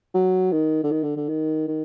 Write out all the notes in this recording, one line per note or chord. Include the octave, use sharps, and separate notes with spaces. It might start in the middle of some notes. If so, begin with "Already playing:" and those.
F#3
D#3
D3
D#3
D3
D3
D#3
D#3